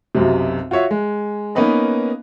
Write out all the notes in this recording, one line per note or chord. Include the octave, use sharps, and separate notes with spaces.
B1 F#2 C3
F4 F#4 C#5 E5
G#3
A#3 B3 C#4 D#4 B4 D#5